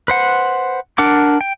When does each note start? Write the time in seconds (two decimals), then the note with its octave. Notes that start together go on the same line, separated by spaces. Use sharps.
0.08 B4 C5 F#5
0.98 D4 A#4 F#5 D6
1.41 G5